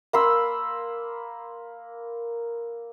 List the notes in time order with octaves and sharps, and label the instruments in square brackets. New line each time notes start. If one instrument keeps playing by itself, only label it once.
[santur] A#3 B5 C6 E6